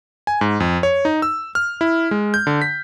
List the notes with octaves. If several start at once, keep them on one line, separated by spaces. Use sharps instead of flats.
G#5
G#2
F2
C#5
D#4
E6
F6
E4
G#3
G6
D3
B6